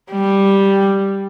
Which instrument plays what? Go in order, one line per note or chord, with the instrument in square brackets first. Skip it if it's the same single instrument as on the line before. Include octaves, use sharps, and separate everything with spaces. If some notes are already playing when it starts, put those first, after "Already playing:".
[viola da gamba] G3